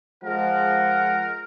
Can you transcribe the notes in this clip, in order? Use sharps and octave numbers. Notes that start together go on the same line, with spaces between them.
F3 G#3 A#4 F#5